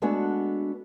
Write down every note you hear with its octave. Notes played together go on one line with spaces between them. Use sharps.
G#3 A3 B3 D4 F#4